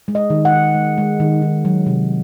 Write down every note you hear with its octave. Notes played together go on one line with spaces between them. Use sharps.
G#3
D#5
D#3
F#5
D#3
G#3
G#3
D#3
D#3
F#3
C3